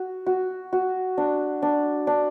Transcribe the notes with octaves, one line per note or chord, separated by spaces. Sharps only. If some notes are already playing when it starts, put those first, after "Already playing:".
Already playing: F#4
F#4
F#4
D4
D4
D4